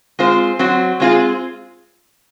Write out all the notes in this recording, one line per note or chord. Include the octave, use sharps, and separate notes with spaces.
G#3 C4 F4 C5
F#3 C4 F#4
G#3 C4 F4 G#4